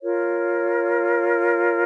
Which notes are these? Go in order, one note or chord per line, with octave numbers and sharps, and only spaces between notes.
F4 A#4 C#5